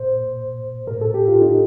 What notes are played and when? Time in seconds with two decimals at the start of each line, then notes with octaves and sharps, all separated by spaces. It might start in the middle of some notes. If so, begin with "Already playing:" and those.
Already playing: A#2 C5
0.87 A2 A#4
1.01 A4
1.14 G4
1.28 F4
1.41 D#4